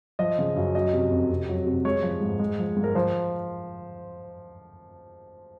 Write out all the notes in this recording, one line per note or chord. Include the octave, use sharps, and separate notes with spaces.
F3 D#5
C#3
F#2
F#3 D#5
C3
F2
C3
F#3
C3
G#3 C#5
F3
G#2
G#3
F3
G#2
A#4
F3 C5